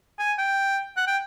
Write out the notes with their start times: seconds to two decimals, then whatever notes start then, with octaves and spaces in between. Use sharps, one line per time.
0.19 G#5
0.38 G5
0.97 F#5
1.07 G5